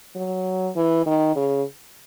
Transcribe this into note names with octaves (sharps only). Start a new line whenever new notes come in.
F#3
E3
D#3
C#3